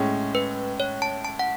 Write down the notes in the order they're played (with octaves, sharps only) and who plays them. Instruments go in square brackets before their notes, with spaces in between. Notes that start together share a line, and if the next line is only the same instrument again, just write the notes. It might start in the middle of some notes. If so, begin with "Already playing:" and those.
Already playing: [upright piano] A2 G#3 C#4
[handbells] B4
C#5
A5
A5
F#5